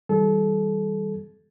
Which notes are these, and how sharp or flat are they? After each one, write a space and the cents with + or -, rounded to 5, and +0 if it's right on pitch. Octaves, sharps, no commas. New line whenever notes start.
E3 -45 G3 +0 A4 -30